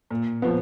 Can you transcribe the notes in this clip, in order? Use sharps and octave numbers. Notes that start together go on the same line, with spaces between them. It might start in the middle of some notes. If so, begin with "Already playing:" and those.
A#2
F3 B3